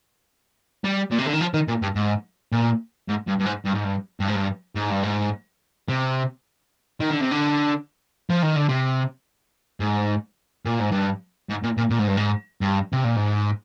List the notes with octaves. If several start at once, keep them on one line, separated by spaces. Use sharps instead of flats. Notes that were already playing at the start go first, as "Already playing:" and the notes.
G3
A#2
C3
D3
D#3
F3
D#3
A#2
G2
G#2
A#2
G#2
G2
G2
G#2
G2
G#2
G2
G2
G#2
G2
G#2
G2
G#2
C3
D#3
D3
C3
D3
F3
D#3
D3
C3
G#2
A#2
G#2
G2
G#2
A#2
A#2
A#2
G#2
G2
G#2
G2
C3
A#2
G#2